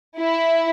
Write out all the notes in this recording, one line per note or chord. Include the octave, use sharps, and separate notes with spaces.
E4